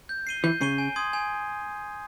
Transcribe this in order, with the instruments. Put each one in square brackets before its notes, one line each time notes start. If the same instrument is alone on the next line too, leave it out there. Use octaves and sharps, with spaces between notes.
[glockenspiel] G6
C7 D#7 G7
[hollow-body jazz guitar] E3 [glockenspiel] G6
[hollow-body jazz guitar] C#3 [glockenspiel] C7 D#7 G7
[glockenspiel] G#5
C6 D#6 G#6
G#5